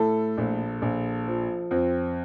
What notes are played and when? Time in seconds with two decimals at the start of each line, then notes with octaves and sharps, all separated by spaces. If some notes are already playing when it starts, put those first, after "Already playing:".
Already playing: A2 A4
0.37 A#1
0.82 A#1
1.27 F3
1.71 F2 C4